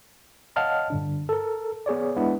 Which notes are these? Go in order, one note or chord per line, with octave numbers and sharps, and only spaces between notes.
C#5 D#5 F5 F#5 A5 F6
G2 D3 D4
A4 A#4
B3 G#4 C#5 D5
G#3 B3 D4 E4